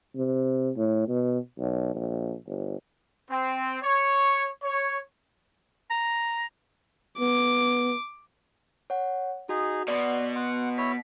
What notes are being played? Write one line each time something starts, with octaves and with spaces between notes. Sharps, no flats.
C3
A2
B2
B1
A#1
G1
C4
C#5
C#5
A#5
B3 D6
C#5 F#5
D#4 F#4 G#4
B2 B3 D5 C6
F#5 C6
E4 C#5 B6